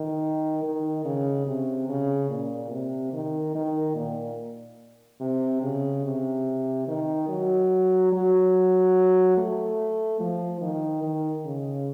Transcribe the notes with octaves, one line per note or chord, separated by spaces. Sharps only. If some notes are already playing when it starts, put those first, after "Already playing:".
Already playing: D#3
D#3
C#3
C3
C#3
A#2
C3
D#3
D#3
A#2
C3
C#3
C3
D#3
F#3
F#3
A3
F3
D#3
D#3
C#3